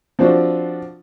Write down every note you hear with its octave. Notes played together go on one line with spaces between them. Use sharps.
F3 C4 D4 F#4